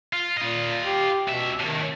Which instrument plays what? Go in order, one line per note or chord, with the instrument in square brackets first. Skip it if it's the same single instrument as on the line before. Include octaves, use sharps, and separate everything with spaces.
[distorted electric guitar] F4
[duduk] A#2 [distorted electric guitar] F4 D#5
[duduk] G4
[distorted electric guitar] C#2 E5 [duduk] B2
[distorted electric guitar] A2 C3 [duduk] D#3